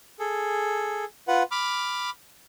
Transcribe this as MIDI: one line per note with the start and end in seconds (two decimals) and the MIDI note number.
0.20 1.05 68
0.20 1.05 69
1.28 1.43 65
1.28 1.43 71
1.28 1.43 78
1.51 2.10 83
1.51 2.10 86
1.51 2.10 89